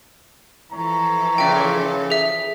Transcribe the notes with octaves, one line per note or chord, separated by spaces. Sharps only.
E3 F3 A4 C#5 A#5
A#2 C#3 E5 G5
G#4 E5